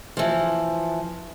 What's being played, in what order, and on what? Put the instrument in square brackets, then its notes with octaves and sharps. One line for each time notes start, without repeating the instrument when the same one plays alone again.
[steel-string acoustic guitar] E3 F3